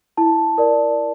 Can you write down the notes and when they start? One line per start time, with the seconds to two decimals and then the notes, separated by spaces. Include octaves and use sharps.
0.17 E4 A5
0.58 A#4 D5